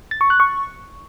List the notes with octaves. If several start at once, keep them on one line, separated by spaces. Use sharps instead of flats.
A6
C#6
F#6
C#6